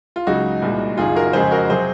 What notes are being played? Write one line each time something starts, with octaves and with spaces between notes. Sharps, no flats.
F4
C#2 C#3 F#3 D#4 F#4
C2 A#2 G#3
F#1 F#2 D#3 F4 G#4
F#4 A#4
F2 C#3 G#3 G#4 C5
F#4 A#4
C3 F#3 G#4 C5